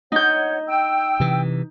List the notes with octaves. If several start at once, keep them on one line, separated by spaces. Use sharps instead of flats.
D#4 C#5 F#5 G6
G5 E6
C3 E3